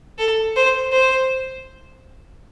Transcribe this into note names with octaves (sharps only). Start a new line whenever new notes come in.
A4
C5
C5